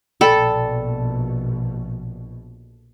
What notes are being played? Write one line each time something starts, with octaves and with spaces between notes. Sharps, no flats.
A#1 B2 A4 D5 G5 B5